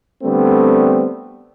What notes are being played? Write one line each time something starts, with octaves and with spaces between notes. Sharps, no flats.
D3 G3 A3 B3 C4